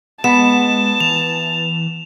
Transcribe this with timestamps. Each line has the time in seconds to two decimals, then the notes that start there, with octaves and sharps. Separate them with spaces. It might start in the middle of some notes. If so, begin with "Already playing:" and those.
0.24 G#3 B3 A5 E7
1.00 E3 F7